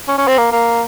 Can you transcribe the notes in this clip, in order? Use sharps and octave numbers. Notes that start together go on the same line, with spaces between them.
C#4
C#4
C4
A#3
A#3